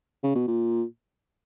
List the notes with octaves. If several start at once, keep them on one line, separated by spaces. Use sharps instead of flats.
C#3
B2
A#2